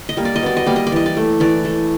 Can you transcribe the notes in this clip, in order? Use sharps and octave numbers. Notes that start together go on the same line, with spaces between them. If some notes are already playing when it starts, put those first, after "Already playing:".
D#5
G3 A#3
D5
D#5
B2 D5
D#5
G3 A#3 D5
D#5
D5
E3 D#5
D5
A3
E3 D5
A3